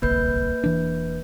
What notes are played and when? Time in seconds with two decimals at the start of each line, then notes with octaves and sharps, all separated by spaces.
0.02 D1 G1 C2 A#3 B4 G6
0.64 E1 E3 D4